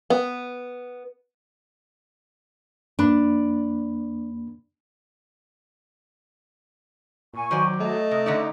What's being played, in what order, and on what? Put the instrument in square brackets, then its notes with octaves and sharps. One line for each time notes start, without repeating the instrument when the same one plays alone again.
[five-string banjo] B3
[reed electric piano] F2 A#3 B5 [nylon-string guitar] D4
[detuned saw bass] A#2 [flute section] G#5 C#6
[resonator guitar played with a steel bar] D#3 C5 D5 [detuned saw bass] F#3
[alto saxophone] A3 [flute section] D#5
[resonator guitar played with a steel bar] C3
[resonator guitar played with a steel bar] D3 C#4 D5 [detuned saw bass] D#4